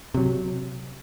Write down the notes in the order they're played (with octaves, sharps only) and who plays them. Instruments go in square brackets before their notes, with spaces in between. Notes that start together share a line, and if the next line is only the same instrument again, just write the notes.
[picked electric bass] C3 F#3